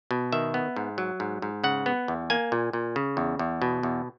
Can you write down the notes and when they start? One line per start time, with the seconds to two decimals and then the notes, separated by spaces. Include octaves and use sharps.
0.11 B2
0.32 D#3 E5
0.54 B3
0.76 G#2
0.98 F#3
1.20 G#2
1.42 G#2
1.64 C#3 F#5
1.86 B3
2.08 E2
2.30 A#3 G#5
2.52 A#2
2.73 A#2
2.96 C#3
3.17 E2
3.39 E2
3.62 B2
3.83 E2